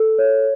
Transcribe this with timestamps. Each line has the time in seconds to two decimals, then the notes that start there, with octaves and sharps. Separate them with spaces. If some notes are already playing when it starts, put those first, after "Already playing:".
Already playing: A4
0.18 C#5